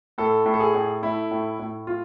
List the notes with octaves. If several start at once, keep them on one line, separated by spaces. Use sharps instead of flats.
A2 A4
A2
A4
G#4
A2
A3 E4
A2
A2
F4